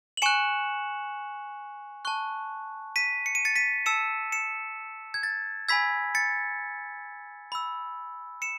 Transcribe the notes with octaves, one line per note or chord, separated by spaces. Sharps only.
F#7
G#5 C#6 F#6 C#7 E7
A5 C#6 F#6
B6 D#7
C#7
D#7
A6 C#7
B6 D#7
A5 E6 C#7 E7
C#7 E7
G#6
A6
G#5 B5 E6 G#6 B6
A6 C#7
B5 E6
C#7 E7